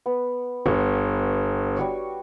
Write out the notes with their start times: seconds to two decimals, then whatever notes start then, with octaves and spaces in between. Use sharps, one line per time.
0.06 B3
0.66 G1 C#5
1.77 G3 F#4 C#5